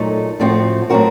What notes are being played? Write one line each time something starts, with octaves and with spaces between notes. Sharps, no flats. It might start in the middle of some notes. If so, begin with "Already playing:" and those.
Already playing: A#2 F#3 A3 D#4 A4
A2 F3 A3 C4 F#4
A2 F#3 C4 F#4 A#4